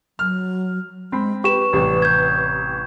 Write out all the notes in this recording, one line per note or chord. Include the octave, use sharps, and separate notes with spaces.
F#3 F6
G#3 C4 B5
G4 B4 C#6 E7
A1 C3 G3
G6 G#6